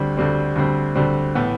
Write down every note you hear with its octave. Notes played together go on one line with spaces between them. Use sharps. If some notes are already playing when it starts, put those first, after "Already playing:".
Already playing: D2 D3 G3 C4
D2 D3 G3 C4
D2 D3 G3 C4
D2 D3 G3 C4
A2 E3 B3